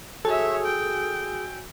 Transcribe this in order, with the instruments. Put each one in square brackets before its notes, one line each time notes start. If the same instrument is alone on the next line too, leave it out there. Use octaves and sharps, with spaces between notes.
[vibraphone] F#4 G#5 E6 [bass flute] G#4 [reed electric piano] A4 [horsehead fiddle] C#5 E5
[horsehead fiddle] G5